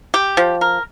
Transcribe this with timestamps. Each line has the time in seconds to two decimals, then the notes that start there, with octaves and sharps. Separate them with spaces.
0.14 G4
0.37 F3
0.61 A#4